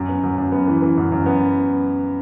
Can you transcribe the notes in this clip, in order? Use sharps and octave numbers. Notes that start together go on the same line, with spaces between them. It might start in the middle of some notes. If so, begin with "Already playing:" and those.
Already playing: F#2
B3
F#2
F#2
B3
E3
E3
F#2
F#2
B3